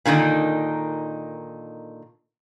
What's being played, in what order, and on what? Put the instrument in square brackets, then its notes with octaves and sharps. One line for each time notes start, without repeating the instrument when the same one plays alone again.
[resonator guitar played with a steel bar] A#2 D3 D#3 D#4